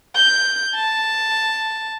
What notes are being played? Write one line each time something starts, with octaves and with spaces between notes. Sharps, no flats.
G6
A5